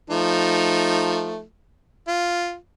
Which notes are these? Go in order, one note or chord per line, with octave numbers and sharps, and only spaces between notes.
F3 A3 D#4
F4